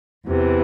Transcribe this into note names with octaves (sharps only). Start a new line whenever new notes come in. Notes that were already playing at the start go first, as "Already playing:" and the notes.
E2 C3 E3